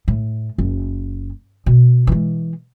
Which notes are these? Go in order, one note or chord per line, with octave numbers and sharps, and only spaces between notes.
A2
F#1
B2
E3 G#3